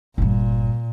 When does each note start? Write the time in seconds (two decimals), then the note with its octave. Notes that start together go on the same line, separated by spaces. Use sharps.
0.18 G1 G2 A#2